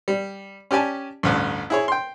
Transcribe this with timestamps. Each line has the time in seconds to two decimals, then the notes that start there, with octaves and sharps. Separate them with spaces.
0.08 G3
0.71 C#4 G4 D5 G#5 A5
1.23 A1 D2 G2
1.70 E4 G#4 C#5
1.88 G5 C6